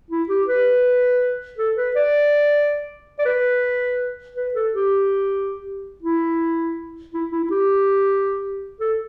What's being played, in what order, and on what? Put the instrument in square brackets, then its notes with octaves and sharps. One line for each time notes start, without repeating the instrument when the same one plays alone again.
[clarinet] E4
G4
B4
A4
B4
D5
D5
B4
B4
A4
G4
E4
E4
E4
E4
G4
A4